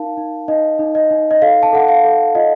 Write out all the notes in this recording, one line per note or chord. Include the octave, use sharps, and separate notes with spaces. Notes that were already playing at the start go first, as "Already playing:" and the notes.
Already playing: D#4 A#4 F5 A5
D#4
D#4 D#5
D#4
D#5
D#4
D#5
A4 F5
A5
A4 F#5
F5
A4
F4 D#5